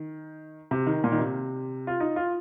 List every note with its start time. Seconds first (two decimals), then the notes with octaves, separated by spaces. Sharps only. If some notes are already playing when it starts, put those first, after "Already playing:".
Already playing: D#3
0.71 C3
0.87 D#3
1.04 A#2
1.12 D#3
1.19 C3
1.87 F4
2.00 D#4
2.16 F4